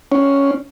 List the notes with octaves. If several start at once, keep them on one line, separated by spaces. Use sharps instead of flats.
C#4